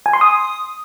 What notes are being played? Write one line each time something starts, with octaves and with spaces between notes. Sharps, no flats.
G#5
C6
D#6